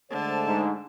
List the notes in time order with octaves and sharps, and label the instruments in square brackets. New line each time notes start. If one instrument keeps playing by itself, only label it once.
[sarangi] D3 [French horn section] G#3 A3 C5 [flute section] A5
[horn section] G#2